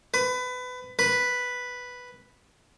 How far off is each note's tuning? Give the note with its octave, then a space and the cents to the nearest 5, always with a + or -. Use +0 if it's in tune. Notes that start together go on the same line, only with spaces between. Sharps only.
B4 +25
B4 +0